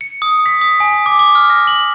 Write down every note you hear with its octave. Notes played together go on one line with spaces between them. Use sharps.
C#7
D#6
B6
D#6
G#5
D6
D6
F6
A#6
F#7